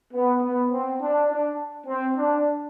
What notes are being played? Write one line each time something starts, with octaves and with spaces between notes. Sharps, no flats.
B3
B3
C4
D4
D4
C4
D4